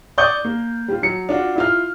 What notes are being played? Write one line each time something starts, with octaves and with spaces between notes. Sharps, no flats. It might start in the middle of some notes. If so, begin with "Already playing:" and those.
D5 C#6 D#6 G6 G7
A#3
G3 F4
F#3 C#7
D4 F4 F#4
E4 F4 F6